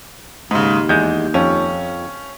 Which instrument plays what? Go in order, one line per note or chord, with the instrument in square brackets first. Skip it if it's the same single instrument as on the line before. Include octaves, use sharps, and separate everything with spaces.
[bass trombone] D#2 [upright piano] G#2 C#3
[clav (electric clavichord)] E2 G#3 [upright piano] G6
[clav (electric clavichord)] F2 [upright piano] C#4